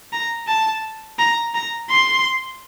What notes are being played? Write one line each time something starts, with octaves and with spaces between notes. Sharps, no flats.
A#5
A5
A#5
A#5
C6